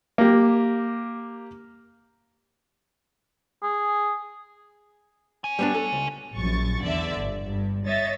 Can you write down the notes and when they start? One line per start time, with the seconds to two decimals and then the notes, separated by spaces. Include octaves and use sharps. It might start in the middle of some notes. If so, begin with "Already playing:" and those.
0.18 A#3 G4
3.63 G#4
5.44 C#5 G#5
5.59 G3 B3 D4
5.75 A4
5.92 C#2
6.37 A#1 F#2 C#6 A6
6.82 E2 D3 D5 E5
7.19 G1
7.51 G2
7.86 C#5 D#5 E5 A6